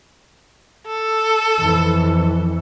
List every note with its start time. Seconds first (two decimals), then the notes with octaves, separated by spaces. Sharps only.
0.86 A4
1.60 F2 E3